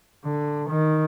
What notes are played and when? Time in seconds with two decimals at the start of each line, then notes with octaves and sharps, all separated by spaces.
0.25 D3
0.69 D#3